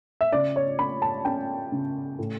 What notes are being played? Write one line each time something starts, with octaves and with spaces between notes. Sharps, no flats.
E5
C#3 D5
C#5
C#4 B5
A5
C#4 G5
C#3
A2